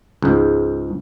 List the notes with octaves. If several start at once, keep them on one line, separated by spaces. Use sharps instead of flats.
C#2 G#2